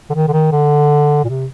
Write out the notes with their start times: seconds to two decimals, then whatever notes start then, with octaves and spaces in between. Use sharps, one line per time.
0.10 D3
0.14 D#3
0.28 D3
0.33 D#3
0.52 D3
1.24 A#2
1.29 C3